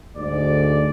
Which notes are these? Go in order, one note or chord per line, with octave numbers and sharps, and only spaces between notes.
D2 G#2 D5